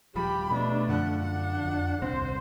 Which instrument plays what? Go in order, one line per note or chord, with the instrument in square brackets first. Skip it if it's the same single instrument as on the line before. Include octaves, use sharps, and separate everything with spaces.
[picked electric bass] D#1 F3 G3 [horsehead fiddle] G4 [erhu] B5
[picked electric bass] B2 [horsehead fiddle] A3 D4
[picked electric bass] F#2 D3 F3 [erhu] F#5
[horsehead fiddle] D4 [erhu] F#5
[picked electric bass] F2
[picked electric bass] D#1 C2 C4 [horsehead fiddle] C5